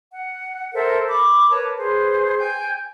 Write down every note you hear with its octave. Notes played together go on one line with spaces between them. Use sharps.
F#5
A4 A#4 C5 E5
B5 D6
A#4 B4 C#5 A5
G#4 B4 C5
G5 G#5 G6